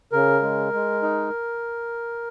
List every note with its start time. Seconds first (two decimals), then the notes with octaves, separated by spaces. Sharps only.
0.13 C#3 A#4
0.43 G#3
0.73 G#3
1.03 D#4